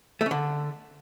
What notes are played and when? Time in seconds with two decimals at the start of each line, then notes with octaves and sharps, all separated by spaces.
0.21 A3
0.26 C#4
0.31 D3